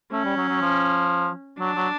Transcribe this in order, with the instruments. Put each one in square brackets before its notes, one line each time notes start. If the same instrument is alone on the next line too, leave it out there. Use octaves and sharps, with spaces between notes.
[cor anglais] A3 [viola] C#4
[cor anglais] G3
F#3
F#3
F3
[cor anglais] F#3 [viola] D4
[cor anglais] F#3